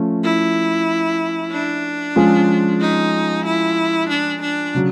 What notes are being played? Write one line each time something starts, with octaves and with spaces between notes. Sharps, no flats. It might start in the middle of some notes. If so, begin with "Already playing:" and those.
Already playing: F3 A3 C#4
E4
D4
F3 G#3 C#4 F4 G#4
D#4
E4
D4
D4
C#3 F#3